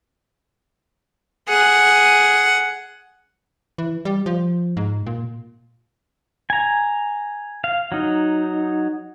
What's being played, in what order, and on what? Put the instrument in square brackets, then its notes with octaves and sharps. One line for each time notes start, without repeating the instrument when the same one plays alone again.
[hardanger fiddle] G#4 F#5
[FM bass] E3
G3
F3
G#2
A#2
[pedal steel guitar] G#5 A#5
F5
F#3 D#4